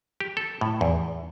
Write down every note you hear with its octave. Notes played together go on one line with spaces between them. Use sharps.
G4
A4
A2
E2